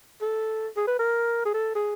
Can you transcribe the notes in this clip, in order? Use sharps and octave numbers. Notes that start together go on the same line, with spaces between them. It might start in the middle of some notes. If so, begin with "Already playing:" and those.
A4
G#4
B4
A#4
G#4
A4
G#4